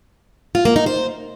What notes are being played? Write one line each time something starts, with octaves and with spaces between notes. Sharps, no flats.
F4
A#3
D#4
C5